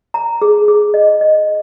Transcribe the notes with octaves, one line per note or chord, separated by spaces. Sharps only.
A#5
G#4
G#4
D#5
D#5